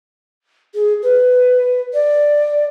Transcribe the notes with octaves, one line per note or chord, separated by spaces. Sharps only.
G#4
B4
D5